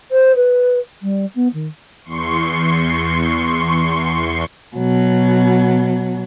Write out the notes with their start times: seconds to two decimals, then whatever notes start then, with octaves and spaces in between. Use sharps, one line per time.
0.12 C5
0.36 B4
1.02 G3
1.35 B3
1.54 D#3
2.04 E2 C6 C#6
4.76 B2 F#3